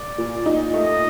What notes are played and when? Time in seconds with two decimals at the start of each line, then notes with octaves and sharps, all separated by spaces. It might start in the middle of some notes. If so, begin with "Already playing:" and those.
Already playing: D5
0.18 A#2
0.46 D#4
0.74 A3 D#5